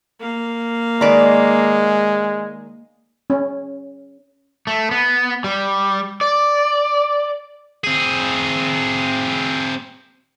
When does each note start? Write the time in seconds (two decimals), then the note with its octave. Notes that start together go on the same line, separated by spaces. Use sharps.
0.19 A#3 F5
1.01 D#3 G#3 B4 D5
3.30 C#4
4.67 A3
4.91 B3
5.44 G3
6.21 D5
7.84 C4 G#4